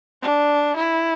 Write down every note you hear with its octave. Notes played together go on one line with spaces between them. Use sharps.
D4
E4